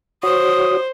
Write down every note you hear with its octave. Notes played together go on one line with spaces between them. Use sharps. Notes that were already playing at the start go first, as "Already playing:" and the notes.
F#4 C5 C#5 D#6